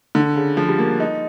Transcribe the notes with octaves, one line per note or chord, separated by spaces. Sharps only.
D3
C#3
F3
G3
A#3
D#4